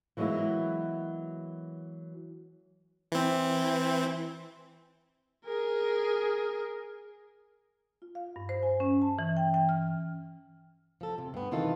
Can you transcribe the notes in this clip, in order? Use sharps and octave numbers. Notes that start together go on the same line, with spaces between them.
E3 F#3 G#3 A#3 B3 E4
E3 C4
G#4 A#4
F4
F5
G2
C5
G#5
C#4
A5
E3
G5
G5
F6
F3 A4
C3
G2 B3
C3 D#3 E3 F4 A4